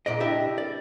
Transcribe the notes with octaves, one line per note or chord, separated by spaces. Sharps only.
C#2 A#2 D5 D#5
D4 E4 G4 D#5 E5
D5